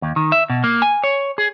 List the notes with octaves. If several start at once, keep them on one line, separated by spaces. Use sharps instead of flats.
D#2
D#3
E5
B2
A#3
G#5
C#5
G#4